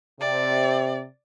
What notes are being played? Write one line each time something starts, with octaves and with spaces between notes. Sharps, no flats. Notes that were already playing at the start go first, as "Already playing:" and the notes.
C3 D5